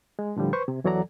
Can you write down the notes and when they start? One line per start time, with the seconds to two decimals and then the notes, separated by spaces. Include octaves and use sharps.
0.19 G#3
0.36 A2 D3 F3 G3
0.53 B4 C5 C#6
0.68 C3
0.84 E2 E3 F#3 A4 D5 A#5